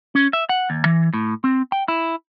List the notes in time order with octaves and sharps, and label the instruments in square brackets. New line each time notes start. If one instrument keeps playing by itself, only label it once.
[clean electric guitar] C#4
E5
F#5
D#2
E3
A2
C4
G5
E4